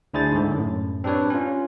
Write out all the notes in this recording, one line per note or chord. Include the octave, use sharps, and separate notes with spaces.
D2 D4 E4 G#4 C5 A6
G#2 D3
F#2 A2
C4 D4 G4 B4 C#5
C#4 F4